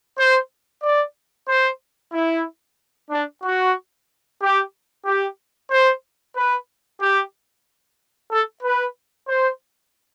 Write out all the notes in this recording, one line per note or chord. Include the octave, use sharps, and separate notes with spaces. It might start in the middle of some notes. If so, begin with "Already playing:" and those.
C5
D5
C5
E4
D4
F#4
G4
G4
C5
B4
G4
A4
B4
C5